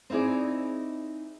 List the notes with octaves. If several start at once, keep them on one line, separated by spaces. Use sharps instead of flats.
C4 D#4 E4 G#4 D5